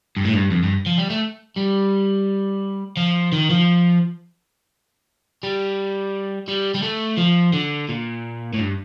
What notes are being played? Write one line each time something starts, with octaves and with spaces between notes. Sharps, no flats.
G2
A2
G2
F2
G2
F3
G3
A3
G3
F3
D#3
F3
G3
G3
G3
A3
F3
D3
A#2
A2
G2